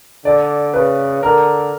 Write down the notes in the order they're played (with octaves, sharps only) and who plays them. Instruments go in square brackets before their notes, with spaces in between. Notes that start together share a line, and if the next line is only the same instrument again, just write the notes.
[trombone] D3 [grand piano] D5
[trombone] C#3 [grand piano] B4
[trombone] D3 [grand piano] A#4